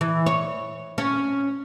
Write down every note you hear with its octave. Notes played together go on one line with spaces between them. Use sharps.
E3
C#5
C#4